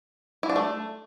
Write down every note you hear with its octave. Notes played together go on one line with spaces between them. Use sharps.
E4
D4
A3